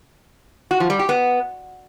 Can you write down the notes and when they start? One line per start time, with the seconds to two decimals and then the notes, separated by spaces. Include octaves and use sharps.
0.71 F#4
0.80 F3
0.90 G3
0.99 G4
1.09 B3